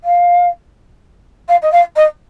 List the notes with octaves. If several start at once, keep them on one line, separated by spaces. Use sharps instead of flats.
F5
F5
D#5
F5
D#5